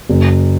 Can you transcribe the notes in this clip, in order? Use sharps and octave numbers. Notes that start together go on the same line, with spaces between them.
F#1